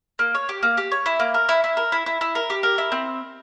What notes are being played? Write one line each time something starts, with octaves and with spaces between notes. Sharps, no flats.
A#3
C#5
G4
A#3
G4
C#5
E4
A#3
A#4
E4
E4
A#4
E4
E4
E4
A#4
G4
A#4
E4
C4